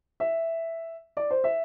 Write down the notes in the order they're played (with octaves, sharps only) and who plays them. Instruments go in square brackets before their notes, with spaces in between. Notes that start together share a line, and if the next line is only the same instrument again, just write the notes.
[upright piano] E5
D5
C5
E5